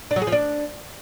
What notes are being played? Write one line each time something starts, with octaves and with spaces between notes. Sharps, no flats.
D4
F#3
G#4
F3
D4